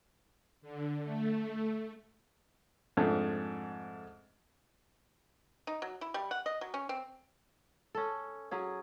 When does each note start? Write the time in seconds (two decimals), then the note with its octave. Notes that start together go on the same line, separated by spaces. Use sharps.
0.62 D3
1.03 A3
2.97 F2 G#2 A3 D4
5.67 D#4
5.82 F#3
6.01 E4
6.14 G3
6.31 F#5
6.46 D#5
6.61 F#3
6.74 C#4
6.89 C4
7.95 C#4 A4
8.51 F#3 C#4 G#4